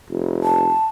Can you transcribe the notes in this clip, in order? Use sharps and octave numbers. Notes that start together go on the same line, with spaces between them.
F1
A5